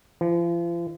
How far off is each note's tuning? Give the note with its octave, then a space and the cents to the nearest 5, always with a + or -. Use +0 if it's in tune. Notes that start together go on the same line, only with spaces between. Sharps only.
F3 -40